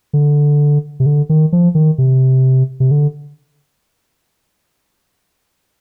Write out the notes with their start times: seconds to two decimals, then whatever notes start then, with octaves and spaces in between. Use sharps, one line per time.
0.13 D3
1.00 C3
1.06 D3
1.29 D#3
1.53 F3
1.75 D#3
1.98 C3
2.80 C3
2.91 D3